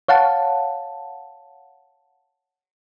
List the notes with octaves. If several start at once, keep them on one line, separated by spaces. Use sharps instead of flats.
C#5 F5 F#5 A5